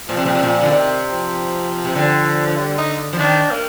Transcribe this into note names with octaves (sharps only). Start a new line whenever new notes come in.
A#2 F3
C3
A#2
C3
A#2
D3
C3 D#3
F3
C3
D3
F3
G3
D#4
F3
D#3 D4
A#3